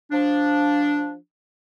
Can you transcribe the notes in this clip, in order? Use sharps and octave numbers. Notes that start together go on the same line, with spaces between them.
F3 D4